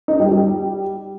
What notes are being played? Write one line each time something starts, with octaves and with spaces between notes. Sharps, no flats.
D#4
G3
G3